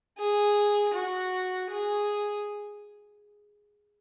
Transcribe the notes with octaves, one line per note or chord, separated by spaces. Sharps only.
G#4
F#4
G#4